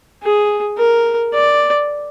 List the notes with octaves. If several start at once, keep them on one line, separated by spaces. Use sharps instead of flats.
G#4
A#4
D5